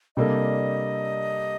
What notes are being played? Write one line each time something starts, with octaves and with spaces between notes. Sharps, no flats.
C3 G3 A#3 D4 A4 D#5